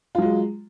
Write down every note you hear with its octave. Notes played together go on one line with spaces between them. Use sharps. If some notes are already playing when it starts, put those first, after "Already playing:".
F#3 G#3 F4